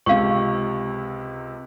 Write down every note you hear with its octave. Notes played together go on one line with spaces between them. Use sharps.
C#2 C3 F5 C#6